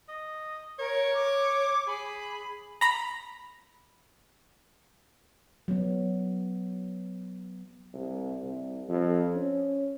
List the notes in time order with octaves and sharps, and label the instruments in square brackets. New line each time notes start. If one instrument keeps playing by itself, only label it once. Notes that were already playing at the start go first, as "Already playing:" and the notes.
[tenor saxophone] D#5
[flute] A#4 [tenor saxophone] C#5
[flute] D6
[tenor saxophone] G#4 [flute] B5
[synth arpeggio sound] A#5 B5
[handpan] F#3 B3
[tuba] C2
C2
F2
C#4